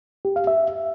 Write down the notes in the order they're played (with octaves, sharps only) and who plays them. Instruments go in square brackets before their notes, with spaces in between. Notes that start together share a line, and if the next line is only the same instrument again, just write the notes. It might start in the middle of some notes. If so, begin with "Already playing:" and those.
[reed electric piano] G4
F5
E5